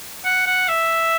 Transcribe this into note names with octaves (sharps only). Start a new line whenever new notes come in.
F#5
F#5
E5